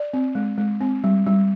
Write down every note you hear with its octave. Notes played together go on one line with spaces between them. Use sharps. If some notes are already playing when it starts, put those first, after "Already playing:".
Already playing: D5
C4
G#3
G#3
C4
G3
G3